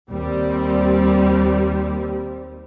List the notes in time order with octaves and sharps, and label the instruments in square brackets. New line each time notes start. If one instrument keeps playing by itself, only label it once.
[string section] D#2 G3 C4